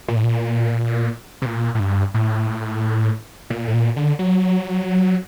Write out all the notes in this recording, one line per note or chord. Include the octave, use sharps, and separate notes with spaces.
A#2
A2
A#2
C3
A#2
A2
G2
A2
A#2
A2
A#2
D3
F#3